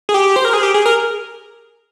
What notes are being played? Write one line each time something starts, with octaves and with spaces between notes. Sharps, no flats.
G#4
G4
C5
A#4
G#4
G4
G#4
A#4